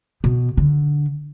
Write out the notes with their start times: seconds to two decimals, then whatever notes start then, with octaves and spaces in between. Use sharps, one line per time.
0.24 B2
0.57 D3